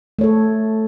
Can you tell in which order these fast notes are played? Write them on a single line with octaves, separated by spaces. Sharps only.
A3 C#5 A4